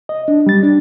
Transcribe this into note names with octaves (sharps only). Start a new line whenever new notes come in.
D#5
D4
G3 A6
D4